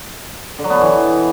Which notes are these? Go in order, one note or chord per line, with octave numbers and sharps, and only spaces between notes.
D3
F#3
B3
B2
E3